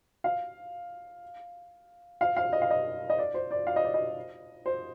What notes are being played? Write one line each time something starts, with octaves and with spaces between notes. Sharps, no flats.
F5
F5
F5
D#5
F5
D#5
D#5
D5
C5
D5
F5
D#5
D5
D#5
C5